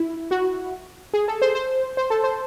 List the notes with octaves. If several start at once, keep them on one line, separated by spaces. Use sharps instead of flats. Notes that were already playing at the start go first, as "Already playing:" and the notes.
Already playing: E4
F#4
G#4
A4
C5
C5
C5
A4
C5